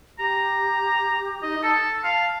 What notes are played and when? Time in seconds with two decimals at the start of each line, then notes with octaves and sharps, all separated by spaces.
0.19 G4 A#5
1.42 D#4 D#5
1.63 A4 A5
2.04 F5